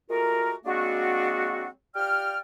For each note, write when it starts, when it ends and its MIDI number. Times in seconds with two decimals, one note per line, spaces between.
0.10 0.55 56
0.10 0.55 57
0.10 0.55 65
0.10 0.55 66
0.10 0.55 70
0.65 1.68 54
0.65 1.68 56
0.65 1.68 58
0.65 1.68 60
0.65 1.68 62
0.65 1.68 66
1.96 2.38 65
1.96 2.38 67
1.96 2.38 74
1.96 2.38 79
1.96 2.38 89